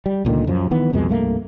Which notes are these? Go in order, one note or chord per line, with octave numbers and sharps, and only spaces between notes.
G3
C#2 A#2 D3 D#3
F#2 F3
D#3 E3 B3
C2 F2 B2 G#3
C2 G2 A3 A#3